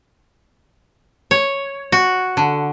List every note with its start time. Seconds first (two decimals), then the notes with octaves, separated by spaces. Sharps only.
1.31 C#5
1.92 F#4
2.37 D3